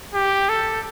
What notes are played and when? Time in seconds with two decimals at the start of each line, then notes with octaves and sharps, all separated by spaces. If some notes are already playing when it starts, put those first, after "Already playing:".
0.14 G4
0.49 A4